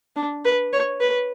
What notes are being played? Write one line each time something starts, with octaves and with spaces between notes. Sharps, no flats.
D4
B4
C#5
B4